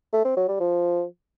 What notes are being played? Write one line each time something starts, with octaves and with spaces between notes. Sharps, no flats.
A3
C4
F#3
G3
F3